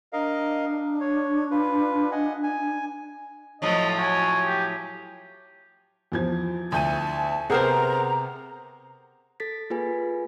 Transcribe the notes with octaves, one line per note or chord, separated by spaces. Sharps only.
D4 A#4 D#5 F5
C#5
F4 B4
D#5 F#5 G#5
G#5
A2 F3 F#3 D#5
F#4 G#5
G4
E2 F3 G#6
D2 A5 G6 D#7
C3 B3 G#4 A#4 C5 F#5 A#5
A4 A6 B6
A#3 F4 G#4 B4 G#5